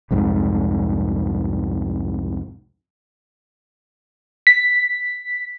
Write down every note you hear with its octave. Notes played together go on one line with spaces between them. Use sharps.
C2 F2 G#2
B6